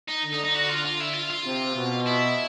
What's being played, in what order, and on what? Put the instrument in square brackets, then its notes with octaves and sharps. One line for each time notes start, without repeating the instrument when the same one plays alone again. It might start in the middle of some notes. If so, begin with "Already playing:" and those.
[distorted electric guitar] D#4
[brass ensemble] D3
[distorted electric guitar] D#4
D#4
F#4
F4
F4
E4
F4
F4
[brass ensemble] C3
B2
[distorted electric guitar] E4